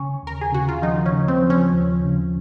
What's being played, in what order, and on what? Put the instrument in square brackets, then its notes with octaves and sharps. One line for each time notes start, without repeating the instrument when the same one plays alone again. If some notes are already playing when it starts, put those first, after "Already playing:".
Already playing: [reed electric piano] C#3 [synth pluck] C#4 C#5
[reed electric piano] D#2 [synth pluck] A#4
[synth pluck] G#4
[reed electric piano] C#3 [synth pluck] F#4
[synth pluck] F4
[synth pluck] D#3 D#4 [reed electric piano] F3
[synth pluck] C#4
[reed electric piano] C#3
[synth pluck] C4
[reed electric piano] F3
[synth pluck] C#4
[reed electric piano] D#2
C#3